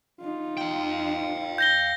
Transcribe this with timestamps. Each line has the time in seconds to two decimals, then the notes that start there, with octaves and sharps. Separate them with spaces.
0.21 D#4 F4
0.57 F5 G5
1.58 G6 A#6 G7